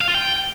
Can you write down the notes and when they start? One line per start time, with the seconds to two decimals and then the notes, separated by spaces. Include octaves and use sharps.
0.01 F5
0.08 F4
0.15 G5